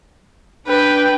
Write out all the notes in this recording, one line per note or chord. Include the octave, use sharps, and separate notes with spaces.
D4 B4 G5